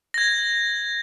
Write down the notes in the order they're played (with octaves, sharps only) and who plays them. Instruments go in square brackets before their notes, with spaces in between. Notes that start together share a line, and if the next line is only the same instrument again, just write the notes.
[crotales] G#6 A#6